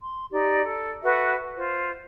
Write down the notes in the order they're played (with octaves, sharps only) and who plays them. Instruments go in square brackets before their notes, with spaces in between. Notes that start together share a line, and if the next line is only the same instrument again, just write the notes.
[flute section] C6
D#4 G4 D5
A4
F#4 A4 B4 E5
F4 C5